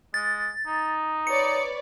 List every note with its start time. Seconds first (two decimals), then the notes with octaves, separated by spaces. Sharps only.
0.14 G#3 A6
0.66 D#4
1.27 B4 C#5 D5 C#7